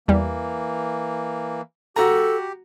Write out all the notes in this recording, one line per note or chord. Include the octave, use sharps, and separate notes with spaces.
E2 E3 G3 A#3
F#4 G4 A4 A#5